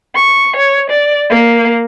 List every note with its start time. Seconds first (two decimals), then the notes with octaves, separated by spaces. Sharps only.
0.15 C#6
0.56 C#5
0.90 D5
1.30 A#3